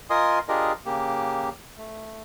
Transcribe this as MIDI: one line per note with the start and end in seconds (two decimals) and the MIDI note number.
0.10 0.39 65
0.10 0.39 70
0.10 0.39 75
0.10 0.39 80
0.10 0.39 84
0.10 0.39 87
0.49 0.72 62
0.49 0.72 65
0.49 0.72 67
0.49 0.72 68
0.49 0.72 70
0.49 0.72 75
0.86 1.49 49
0.86 1.49 58
0.86 1.49 67
1.78 2.23 57